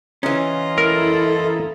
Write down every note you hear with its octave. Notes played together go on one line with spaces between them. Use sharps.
E3 C#4 F4 D#5 A#5
E4 A4 A#4